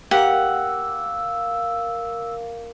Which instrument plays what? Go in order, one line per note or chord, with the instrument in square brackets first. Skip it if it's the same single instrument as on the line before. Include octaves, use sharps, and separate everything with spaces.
[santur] A#3 [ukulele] G4 [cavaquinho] F#5 [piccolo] E6